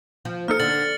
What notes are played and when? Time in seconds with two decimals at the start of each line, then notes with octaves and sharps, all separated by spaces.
0.25 F3
0.48 A#3 D#4 A4 F6 C#7
0.60 D3 A6 F#7